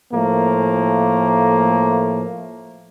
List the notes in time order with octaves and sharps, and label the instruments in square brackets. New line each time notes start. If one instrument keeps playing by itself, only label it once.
[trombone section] A2 F3 A3 A#3